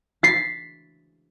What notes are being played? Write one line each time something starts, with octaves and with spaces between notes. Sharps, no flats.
A6 B6 C7